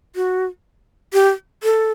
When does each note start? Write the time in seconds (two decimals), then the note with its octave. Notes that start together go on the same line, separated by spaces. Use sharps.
0.16 F#4
1.13 G4
1.63 A4